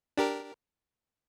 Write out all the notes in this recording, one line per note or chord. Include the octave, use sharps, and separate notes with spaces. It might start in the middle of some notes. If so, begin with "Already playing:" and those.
D4 G4 A#4